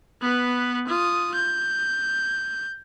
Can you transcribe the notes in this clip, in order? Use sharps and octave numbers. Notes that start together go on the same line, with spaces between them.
B3 B4
F4 D#6
G6